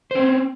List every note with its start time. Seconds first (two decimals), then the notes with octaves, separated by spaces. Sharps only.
0.11 C5
0.15 C#4
0.20 C4